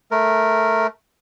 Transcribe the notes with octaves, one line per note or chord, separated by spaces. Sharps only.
A3 A#4